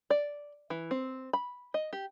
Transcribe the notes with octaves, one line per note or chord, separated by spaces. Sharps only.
D5
E3
C4
B5
D#5
G4